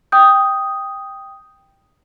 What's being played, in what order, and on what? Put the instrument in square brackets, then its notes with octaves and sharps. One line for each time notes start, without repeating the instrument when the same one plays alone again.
[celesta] G5 D#6 G6